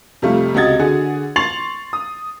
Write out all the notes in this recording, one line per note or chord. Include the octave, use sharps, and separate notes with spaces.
F2 C3 G3 A3 F4
C#2 C3 F#4 D#5 G#6 A6
D3 F#4 G#4
C6 C#6 A6 C7 F7 F#7
D#6